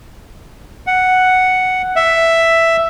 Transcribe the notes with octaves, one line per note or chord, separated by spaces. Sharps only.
F#5
E5